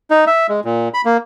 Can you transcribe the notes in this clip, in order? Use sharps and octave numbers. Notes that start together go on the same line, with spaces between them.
D#4
E5
G#3
A#2
B5
A#3